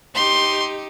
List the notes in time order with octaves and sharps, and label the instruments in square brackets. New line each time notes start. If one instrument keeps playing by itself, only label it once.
[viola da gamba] D#4 G4 [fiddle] C6